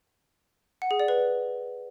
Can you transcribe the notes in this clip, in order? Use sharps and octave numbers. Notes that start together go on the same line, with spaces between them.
F#5
G#4
D5
B4